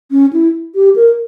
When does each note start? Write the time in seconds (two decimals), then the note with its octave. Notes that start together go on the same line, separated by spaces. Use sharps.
0.11 C#4
0.33 E4
0.75 G4
0.96 A#4